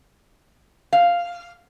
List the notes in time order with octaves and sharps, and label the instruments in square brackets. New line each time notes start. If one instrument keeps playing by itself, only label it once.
[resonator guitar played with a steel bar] F5